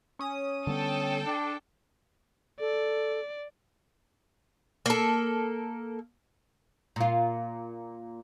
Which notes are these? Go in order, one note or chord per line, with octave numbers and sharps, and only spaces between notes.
C#4 D#6
D3 G3 B3 A4 G5
D4
A4 D5
A#3 A4
A#2 F4